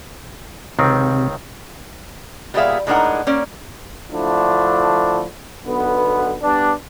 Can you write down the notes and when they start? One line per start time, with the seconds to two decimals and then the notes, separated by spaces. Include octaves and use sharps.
0.79 C#2 C3 D#3 C4
2.54 A#2 G3 B3 G#4 E5 F5
2.87 A2 G#3 D4 D#4 A#4 F#5
3.27 A#3 C#4 D5
4.12 D3 F3 A3 D4 E4
5.65 B1 D3 B3
6.42 G3 B3 D4